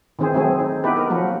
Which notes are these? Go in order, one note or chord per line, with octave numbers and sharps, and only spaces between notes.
D#3 E3 C4 G#4 C5
E3 F#3 A3 C4 G#4
D#4
B3 D#4 E4 G4 B4
A#4
F3 F#3 A#3 F#4